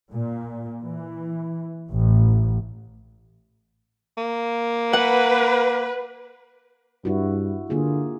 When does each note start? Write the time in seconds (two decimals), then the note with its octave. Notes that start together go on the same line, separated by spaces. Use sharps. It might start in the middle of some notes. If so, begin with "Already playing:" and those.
0.12 A#2
0.84 E3
1.90 A1
4.18 A#3
4.93 B4 F#5
7.05 G2 E4 F#4
7.70 D3 A#3 F4 G#4